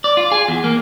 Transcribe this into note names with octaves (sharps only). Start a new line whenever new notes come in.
D5
F4
G#4
E2
A#3